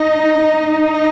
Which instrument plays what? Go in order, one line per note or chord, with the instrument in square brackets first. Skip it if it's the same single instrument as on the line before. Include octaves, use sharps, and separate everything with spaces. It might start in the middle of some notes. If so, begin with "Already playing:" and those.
Already playing: [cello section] D#4 [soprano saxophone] D#5
[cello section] D#4
[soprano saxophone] D#5